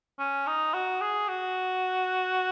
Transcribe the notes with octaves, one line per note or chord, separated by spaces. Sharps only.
C#4
D#4
F#4
G#4
F#4